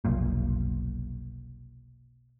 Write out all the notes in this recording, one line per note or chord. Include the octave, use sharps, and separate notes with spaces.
F1 B1 A#2